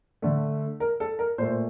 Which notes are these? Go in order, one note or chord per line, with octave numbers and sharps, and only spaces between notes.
D3 A3
A#4
A4
A#4
A#2 A3 C5